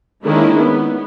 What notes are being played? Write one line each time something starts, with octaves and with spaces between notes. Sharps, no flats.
D#3 G#3 A#3 C#4 D4 E4
B3